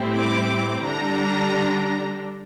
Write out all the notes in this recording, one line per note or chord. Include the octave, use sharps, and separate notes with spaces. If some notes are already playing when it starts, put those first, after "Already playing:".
Already playing: A2 G3 C4 E4
D6
D3 G3 D4 A#5